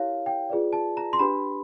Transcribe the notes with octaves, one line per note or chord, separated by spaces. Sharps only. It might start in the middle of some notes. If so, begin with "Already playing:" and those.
Already playing: E4 G4 A#4 C#5 F5
G5
F4 G#4 B4 D5
A5
A#5
C6
D4 G4 B4 B5